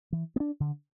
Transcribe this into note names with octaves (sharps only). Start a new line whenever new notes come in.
E3
B3
D4
D3